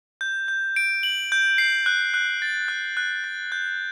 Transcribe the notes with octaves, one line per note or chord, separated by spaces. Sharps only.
G6
G6
D7
F#7
G6
C7
F#6
F#6
A6
F#6
F#6
A6
G6